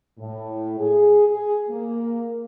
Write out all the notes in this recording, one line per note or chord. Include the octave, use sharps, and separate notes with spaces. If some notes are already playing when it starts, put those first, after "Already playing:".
A2
G#4
G#4
A#3